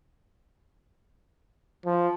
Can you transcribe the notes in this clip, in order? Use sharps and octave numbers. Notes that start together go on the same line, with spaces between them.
F3